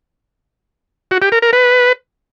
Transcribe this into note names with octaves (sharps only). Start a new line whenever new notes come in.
F#4
G4
A#4
A#4
B4